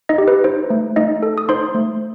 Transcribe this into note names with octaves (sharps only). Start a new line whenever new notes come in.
D#4 D#5
G4
B4
D#4 C5
A3
A3 D#4 D#5
A4
D#6
D#4 C5 C6
A3